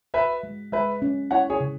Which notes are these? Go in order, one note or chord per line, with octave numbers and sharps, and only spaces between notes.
F#4 B4 E5
G#3
G#3 B4 E5
C#4
E4 C#5 F#5
G#4 C#5
C#3